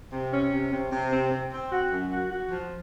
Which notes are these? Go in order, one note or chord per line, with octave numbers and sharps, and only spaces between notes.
C3
C#4
C3
C3
C3
C4
C4
C4
F#4
F#2
F#4
F#4
F3